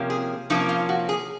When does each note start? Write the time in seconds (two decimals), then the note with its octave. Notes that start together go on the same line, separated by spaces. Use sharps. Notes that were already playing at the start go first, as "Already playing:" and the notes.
Already playing: C3 F3 A#3 C#4
0.10 G#4
0.50 C3 F3 A#3 C#4 D#4
0.69 F4
0.89 F#4
1.09 G#4